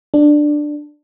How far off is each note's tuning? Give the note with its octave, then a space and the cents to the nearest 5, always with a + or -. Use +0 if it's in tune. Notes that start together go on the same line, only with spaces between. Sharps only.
D4 +10